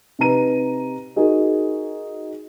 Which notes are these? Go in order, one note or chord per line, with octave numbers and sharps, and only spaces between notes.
C3 D#4 B4 A#5 D#7
D#4 F#4 G#4 A#4